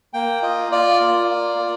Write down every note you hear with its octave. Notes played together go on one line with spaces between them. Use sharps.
A#3 G5
F4 D#5
F4 D5
A#3
F4
A#3